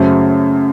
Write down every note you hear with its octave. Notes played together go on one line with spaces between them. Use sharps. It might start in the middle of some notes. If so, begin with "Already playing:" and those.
Already playing: F#2 C#3 F#3 A3 C5